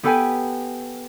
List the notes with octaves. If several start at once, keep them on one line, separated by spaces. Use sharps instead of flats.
B3 G4 A4 B4 G5 G#5